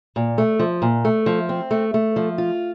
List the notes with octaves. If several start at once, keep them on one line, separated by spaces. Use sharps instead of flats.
A#2
A3
F3
A#2
A3
F3
C4
A3
A3
F3
F4